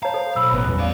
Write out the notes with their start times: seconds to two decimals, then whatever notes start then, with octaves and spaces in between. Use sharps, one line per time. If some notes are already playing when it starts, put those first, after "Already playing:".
0.03 C#5 F5 A5 A#5
0.14 A4 C5
0.36 B1 B5 E6
0.53 A1 B3
0.67 E2 G3 C#4
0.79 C5 D5 F5